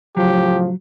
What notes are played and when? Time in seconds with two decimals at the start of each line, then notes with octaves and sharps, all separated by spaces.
0.17 A2 C#3 F3 F#3 G4